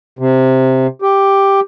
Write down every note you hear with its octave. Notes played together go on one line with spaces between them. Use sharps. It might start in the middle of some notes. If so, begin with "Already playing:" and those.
C3
G4